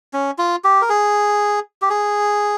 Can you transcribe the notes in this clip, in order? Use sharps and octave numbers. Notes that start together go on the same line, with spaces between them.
C#4
F4
G4
A#4
G#4
G4
G#4